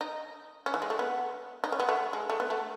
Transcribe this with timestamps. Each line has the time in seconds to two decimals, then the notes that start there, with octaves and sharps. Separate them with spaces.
0.01 D#4
0.66 C#4
0.74 E3
0.82 G#3
0.90 A3
0.99 B3
1.64 D#4
1.72 C#4
1.80 B3
1.89 A3
2.13 G#3
2.30 A3
2.40 B3
2.50 A3